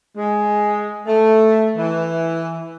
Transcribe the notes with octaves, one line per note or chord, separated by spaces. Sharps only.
G#3
A3
E3